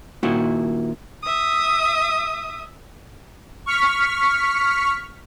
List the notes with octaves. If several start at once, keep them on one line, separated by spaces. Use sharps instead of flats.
A#2 D#3 E4 F#4
E5 D#6
C#6 F6 B6